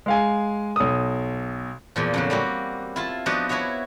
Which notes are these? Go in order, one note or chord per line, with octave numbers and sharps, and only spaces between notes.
G#3 F5 G#5
B1 D#6
E2 A#2 F3
F2 D3 F#3
G3 A#3 C4 F#4
E4 F4 A5
F3 B3 D4 D#4 F#4 B4
E4 F#4 B4 C#5 E5